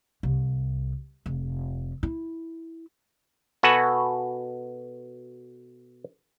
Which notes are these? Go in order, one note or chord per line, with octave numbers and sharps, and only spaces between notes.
C2
F1
E4
B2 F#4 A4 B4 F#5 G#5